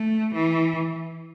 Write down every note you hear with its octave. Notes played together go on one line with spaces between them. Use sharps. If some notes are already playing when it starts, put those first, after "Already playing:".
Already playing: A3
E3